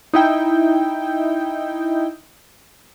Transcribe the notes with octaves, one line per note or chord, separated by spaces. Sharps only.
D#4 E4 G5